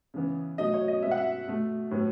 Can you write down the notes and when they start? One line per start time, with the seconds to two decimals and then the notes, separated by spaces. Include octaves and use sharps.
0.14 C#3 E3 B3
0.58 B2 F#3 A3 D#5
0.74 C#5
0.88 D#5
1.02 B2 G#3 B3 E5
1.11 F#5
1.18 E5
1.48 B2 A3
1.91 A2 F#3 B3